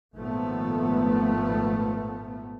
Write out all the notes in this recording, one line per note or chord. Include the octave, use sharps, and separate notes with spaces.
G#1 A#2 F3 A3 B3